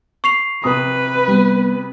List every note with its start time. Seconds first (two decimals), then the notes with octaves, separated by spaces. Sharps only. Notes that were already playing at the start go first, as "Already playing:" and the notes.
0.24 C#6 C7 F7
0.64 C3 B4 D#6
1.28 G3 B3